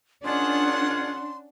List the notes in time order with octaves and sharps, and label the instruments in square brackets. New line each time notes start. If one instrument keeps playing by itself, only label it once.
[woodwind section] D#3 F4 G#4 [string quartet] C#4 F#5 [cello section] D4 [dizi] C6